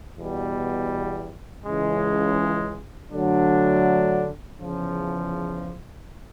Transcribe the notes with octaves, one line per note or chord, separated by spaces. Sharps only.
E2 B2 G3
C#2 C#3 E3 G#3
D3 F#3 A3 D4
E2 C#3 F3